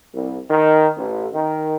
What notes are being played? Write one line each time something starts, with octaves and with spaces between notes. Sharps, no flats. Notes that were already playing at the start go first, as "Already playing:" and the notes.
C2
D#3
A1
D#3